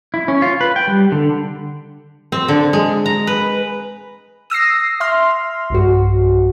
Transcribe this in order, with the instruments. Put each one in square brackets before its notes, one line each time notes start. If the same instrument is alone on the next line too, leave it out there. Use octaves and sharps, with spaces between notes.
[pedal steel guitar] E4
C#4
F4
B4
G5
G3
D3
[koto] C4
D3
G#3
A#5
B4
[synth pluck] D#6 E6 A#6 C7
E5 C6 F6
B1 G2 F#4